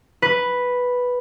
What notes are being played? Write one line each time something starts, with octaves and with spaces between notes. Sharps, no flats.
B4